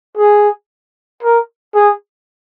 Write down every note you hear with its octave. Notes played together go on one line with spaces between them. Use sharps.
G#4
A#4
G#4